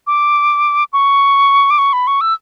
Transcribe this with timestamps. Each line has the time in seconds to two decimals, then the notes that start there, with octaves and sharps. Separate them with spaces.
0.07 D6
0.93 C#6
1.70 D6
1.78 C#6
1.93 B5
2.07 C#6
2.21 E6